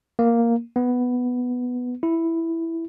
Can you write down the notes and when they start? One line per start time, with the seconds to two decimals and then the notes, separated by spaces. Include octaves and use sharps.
0.19 A#3
0.76 B3
2.03 E4